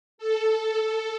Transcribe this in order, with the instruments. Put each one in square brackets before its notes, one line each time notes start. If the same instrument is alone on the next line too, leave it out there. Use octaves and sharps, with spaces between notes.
[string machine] A4